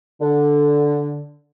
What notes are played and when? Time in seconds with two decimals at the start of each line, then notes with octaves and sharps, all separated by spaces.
0.21 D3